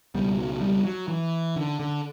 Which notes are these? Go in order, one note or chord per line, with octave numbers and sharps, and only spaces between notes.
C#2 B2 G3
F#3
G3
F#3
E3
D3
D3